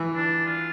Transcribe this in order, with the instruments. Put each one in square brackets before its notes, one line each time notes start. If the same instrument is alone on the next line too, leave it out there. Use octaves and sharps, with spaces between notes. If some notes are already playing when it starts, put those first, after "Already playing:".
Already playing: [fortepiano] E3
[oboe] D4
F4